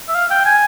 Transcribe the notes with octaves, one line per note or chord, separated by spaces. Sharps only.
E5
F5
G5
G#5